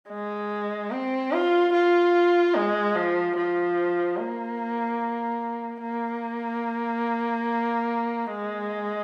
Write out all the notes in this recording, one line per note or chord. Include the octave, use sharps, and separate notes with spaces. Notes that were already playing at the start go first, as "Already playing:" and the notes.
G#3
C4
F4
F4
G#3
F3
F3
A#3
A#3
G#3